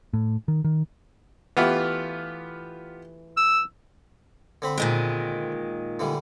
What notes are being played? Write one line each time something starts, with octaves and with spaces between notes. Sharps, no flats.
A2
D#3
D#3
E3 A3 B3 F4 G4
E6
D3 C4 B5
A#2 D#3 G#3
D3 E3 G3